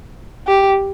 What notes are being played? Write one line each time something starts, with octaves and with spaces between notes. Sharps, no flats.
G4